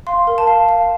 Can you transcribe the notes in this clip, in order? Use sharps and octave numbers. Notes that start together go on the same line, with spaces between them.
F5 C6
A#4
A5
F5
F5